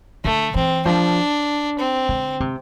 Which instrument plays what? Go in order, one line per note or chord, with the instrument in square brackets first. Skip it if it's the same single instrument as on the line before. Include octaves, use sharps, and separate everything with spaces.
[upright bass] D3 [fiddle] A3
[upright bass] E3 [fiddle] C4
[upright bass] F3 [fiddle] D4
[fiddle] C4
[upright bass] D3
C3